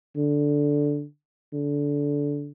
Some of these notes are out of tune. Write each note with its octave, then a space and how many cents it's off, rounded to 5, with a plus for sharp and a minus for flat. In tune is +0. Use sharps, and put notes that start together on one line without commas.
D3 -5
D3 -20